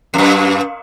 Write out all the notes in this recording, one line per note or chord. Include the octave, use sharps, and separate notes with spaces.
F2
F#2